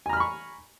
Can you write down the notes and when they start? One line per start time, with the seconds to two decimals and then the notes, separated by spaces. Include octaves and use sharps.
0.06 G#5
0.09 A#5
0.13 F6
0.17 B5
0.20 C#6